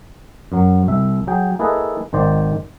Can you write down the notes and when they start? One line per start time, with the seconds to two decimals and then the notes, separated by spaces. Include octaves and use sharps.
0.52 F#2 F#3
0.88 C2 E5
1.27 F#3 G#4 G5
1.59 A#3 E4 G#4 A4 B4 D#5
2.13 G#1 D#3 C5 D5